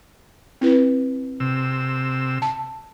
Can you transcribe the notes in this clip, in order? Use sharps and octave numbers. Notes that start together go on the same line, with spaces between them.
C4 E4 B4
C3 E6
A5